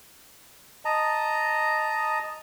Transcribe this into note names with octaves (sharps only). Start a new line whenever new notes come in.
D#5 A5 A#5